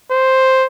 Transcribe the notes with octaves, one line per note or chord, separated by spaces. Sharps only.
C5